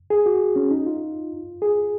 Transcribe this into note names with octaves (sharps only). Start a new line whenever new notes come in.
G#4
F#4
C#4
D#4
F4
G#4